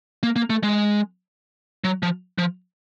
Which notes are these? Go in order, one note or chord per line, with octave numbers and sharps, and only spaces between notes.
A#3
A#3
A3
G#3
F#3
F3
F3